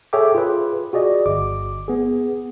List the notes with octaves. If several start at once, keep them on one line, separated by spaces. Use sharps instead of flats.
G#4 A4 C#5 E5 G5 D6
F4 G#4 B4
F#4 G#4 D5 D#5
G1 D6
B3 G#4